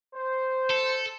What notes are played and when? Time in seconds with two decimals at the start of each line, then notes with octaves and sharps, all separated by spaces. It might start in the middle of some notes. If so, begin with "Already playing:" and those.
0.12 C5
0.70 A4